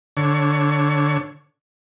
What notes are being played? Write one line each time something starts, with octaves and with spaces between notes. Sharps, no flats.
D3 C#5